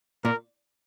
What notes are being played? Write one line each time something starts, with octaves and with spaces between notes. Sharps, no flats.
A#2 A#4